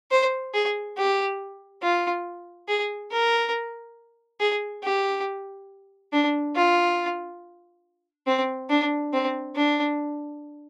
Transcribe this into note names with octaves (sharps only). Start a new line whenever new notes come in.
C5
G#4
G4
F4
G#4
A#4
G#4
G4
D4
F4
C4
D4
C4
D4